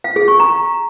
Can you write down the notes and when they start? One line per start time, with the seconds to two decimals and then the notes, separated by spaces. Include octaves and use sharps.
0.04 F5
0.16 G#4
0.28 C#6
0.40 A#5